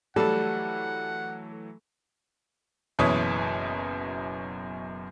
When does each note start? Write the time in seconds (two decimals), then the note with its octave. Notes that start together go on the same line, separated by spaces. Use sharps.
0.16 E3 F#3 G3 A3 A4 F#5
2.99 F#1 F#2 B2 E3 C#5 D#6